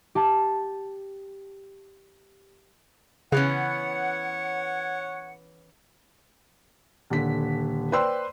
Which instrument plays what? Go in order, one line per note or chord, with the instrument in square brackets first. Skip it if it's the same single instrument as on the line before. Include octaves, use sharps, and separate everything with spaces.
[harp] G4 A5
[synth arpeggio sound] C#3 [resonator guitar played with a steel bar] E3 B3 C#4 [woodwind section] C#5 F#5
[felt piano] D#1 D3 B6
B4 C5 D5 G5 C6 E6